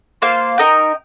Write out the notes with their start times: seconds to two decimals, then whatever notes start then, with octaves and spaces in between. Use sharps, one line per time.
0.22 A#3 F4 C5 F5
0.58 D#4 A#4 D#5 G5